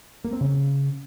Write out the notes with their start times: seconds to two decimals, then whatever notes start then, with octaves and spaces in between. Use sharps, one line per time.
0.24 A#3
0.33 C4
0.41 C#3